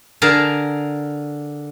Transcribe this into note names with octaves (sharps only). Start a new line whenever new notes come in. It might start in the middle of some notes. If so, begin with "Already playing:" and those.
D3 G#4 A#4 A5